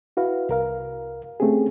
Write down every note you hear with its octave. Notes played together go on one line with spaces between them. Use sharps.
E4 F#4 B4 F5
C2 A#4 F5
A3 C4 C#4 G4 G#4